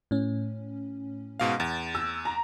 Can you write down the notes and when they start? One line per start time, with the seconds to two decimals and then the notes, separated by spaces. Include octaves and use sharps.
0.11 A2 C#4
1.40 G#2 B2 F5
1.60 E2 A6
1.95 E6
2.25 A#5